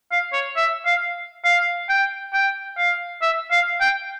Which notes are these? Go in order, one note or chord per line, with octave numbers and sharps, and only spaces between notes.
F5
C#5
E5
F5
F5
G5
G5
F5
E5
F5
G5